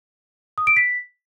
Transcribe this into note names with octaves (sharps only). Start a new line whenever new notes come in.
D#6
D7
B6